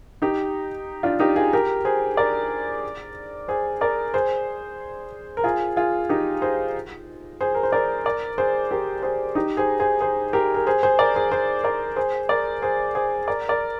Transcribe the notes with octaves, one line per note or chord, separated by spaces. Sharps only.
D#4 G4
D4 F4
D#4 G4
F4 G#4
G4 A#4
G#4 C5
A#4 D5
G#4 C5
A#4 D5
G#4 C5
A#4
F4 G#4
F4 G#4
D#4 G4
G#4 C5
G#4 C5
A#4
C5
A#4 D5
A#4 D5
G#4 C5
G4 A#4
G#4 C5
D#4 G4
G#4 C5
G#4 C5
G#4 C5
G4 A#4
A#4
G#4 C5
G#4 C5
A#4 D5
G#4 C5
G#4 C5
A#4 D5
G#4 C5
A#4 D5
G#4 C5
G#4 C5
A#4 D5
A#4 D5